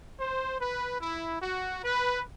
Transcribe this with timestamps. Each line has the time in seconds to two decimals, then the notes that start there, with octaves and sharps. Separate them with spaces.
0.20 C5
0.60 B4
1.01 E4
1.42 F#4
1.84 B4